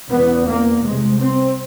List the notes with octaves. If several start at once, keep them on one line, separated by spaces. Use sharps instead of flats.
E2 C#3 B3
A#3
C2 C3 G#3
C4